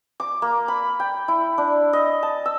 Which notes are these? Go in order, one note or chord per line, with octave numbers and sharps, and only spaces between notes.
D6
A#3
B5
G5
E4
D4
D#5
A5
E6